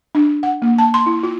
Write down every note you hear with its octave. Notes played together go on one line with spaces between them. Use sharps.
D4
F#5
A#3
A5
C6
E4
F4